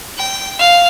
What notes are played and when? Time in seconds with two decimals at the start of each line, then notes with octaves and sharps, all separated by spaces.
0.17 G5
0.59 F5